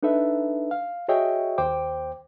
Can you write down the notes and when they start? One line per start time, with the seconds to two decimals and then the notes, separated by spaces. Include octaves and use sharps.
0.03 D4 D#4 A4 B4 E5
0.71 F5
1.08 F#4 G#4 C#5 D#5 E5 G5
1.58 D#2 C5 G5 D6